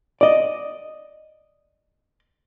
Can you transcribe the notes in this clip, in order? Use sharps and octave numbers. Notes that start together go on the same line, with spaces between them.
D5 D#5